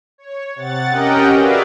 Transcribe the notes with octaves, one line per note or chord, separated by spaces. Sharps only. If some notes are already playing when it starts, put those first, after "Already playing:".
C#5
C3 F#5 A6
C#4 G4 A#4 D#5 F#5 G5
F#4 G#4 B4 D5 E5 F5